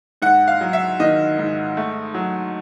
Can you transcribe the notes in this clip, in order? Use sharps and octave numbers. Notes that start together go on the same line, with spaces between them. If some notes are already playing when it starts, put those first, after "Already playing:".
G#2 F#5
F5
F#3
E5
D#3 D#5
G#2
A3
F#3